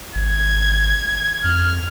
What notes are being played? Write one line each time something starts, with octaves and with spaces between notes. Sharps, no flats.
G#1 G#6
F2 F6